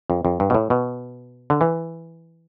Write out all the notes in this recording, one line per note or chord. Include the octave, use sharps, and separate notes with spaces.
F2
F2
G2
B2
A2
B2
D3
E3